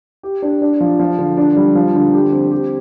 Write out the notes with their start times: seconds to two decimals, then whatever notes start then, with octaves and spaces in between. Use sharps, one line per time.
0.23 G4
0.42 D4
0.61 D4
0.80 F3
0.99 F3
1.18 D3
1.37 D4
1.56 G3
1.75 F3
1.95 D3
2.14 G4
2.32 C4
2.51 G4